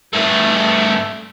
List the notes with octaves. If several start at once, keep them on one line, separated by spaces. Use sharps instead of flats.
G2 A3